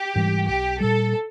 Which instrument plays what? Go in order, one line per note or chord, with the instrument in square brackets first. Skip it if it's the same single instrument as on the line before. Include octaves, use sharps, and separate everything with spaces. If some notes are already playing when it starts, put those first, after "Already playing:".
Already playing: [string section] G4
[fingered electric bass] G#2 E3 G3
[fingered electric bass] B1 [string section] G4
[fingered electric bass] A#2 G3 [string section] A4